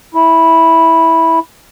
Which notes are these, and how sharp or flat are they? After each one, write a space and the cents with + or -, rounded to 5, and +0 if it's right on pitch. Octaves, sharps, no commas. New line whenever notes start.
E4 -10